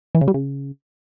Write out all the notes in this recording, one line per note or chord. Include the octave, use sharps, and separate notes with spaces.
E3
C#3
G3
C#3